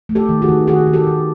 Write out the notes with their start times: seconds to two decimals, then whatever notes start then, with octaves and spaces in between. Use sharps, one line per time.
0.09 A3
0.15 G4 A4
0.29 D#3
0.42 F#4 G#4
0.49 D#3
0.67 D#3 F#4 G#4
0.87 D#3
0.93 G4 A4
1.07 D#3